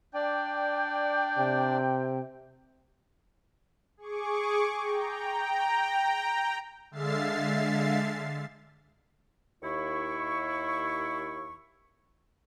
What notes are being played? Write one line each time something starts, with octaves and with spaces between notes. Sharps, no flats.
D4 D5 G5
C3
G#4 C#6 D6
G5 A#5
D3 G#3 E5 F5 A6 C7
D#2 E4 C#6